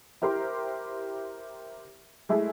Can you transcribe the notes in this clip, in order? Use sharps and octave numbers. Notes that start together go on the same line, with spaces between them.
E4 G4 A#4 C5 C6
G#3 A3 E4 G#4 A4